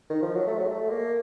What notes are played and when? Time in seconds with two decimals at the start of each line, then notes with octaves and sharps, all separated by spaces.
0.10 D#3
0.22 F3
0.35 F#3
0.47 A3
0.59 F#3
0.68 A3
0.90 A#3